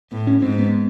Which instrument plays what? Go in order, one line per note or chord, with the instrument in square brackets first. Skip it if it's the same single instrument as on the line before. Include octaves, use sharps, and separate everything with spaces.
[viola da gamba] A2 [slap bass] B3
[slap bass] C#4
[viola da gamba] G#2 [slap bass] C4
[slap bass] B3